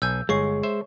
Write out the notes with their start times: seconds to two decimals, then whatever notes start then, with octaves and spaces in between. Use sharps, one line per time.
0.02 B1 G#5 E6 G6
0.29 G1 G#3 C#5 C#6 C7
0.63 C5 E5